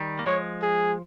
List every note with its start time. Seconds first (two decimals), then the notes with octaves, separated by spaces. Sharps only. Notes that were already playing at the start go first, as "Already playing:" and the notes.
Already playing: D#3 G3
0.19 A#3
0.26 F3 G#3 C#5
0.62 G#4